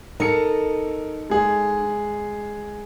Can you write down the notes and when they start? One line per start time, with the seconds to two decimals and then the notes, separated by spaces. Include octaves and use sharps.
0.20 D#4 A4 A#4 D#5 C#7
1.30 G#3 G#4